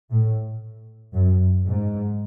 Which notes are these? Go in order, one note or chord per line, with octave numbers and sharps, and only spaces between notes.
A2
F#2
G#2